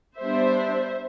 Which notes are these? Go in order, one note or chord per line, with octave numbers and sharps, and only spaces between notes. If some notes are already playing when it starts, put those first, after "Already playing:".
G3 B3 D4 C5 E5